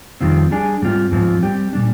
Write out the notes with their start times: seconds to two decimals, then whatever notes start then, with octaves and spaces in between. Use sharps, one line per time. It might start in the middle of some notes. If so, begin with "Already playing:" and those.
0.21 F2 D#3 G3 C4 F4
0.51 G3 D4 G#4
0.82 G#2 G3 C4 F4
1.11 G#2 F3 C4 F4
1.42 G3 C4 G4
1.73 A#2 G3 D4